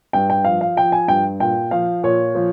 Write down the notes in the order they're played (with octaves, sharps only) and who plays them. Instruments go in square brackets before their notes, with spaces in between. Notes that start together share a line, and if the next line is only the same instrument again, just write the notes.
[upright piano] G2 G5
G5
F3 F5
F5
F3 G5
G#5
G2 G5
A#2 G5
F3 F5
A#2 C#5
F3